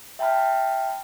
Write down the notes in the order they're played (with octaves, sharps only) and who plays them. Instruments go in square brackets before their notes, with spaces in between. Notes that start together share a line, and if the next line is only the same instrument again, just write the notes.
[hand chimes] E5 G5 A5 B5 F6